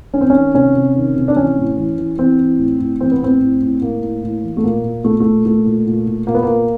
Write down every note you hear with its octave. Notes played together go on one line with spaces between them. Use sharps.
D#3 C#4
C4
D#3 C#4
C3 C#4
C3
D#3
C3
D4
E3 C#4
A2
E3
E3
E3 C4
E3
A2
A2
E3 C4
B3
A2 C4
A2
A2
A2 A#3
A2
A2
E3
A3
A#2 A#3
A#2
A#2 A3
A#2 A3
A#2 A3
A#2
A#2
A#2
A#2 A#3
B3
A#2 A#3